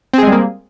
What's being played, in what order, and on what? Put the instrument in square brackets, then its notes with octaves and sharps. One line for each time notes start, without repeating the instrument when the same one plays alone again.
[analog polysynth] C4
G#4
G#3
G3
A#3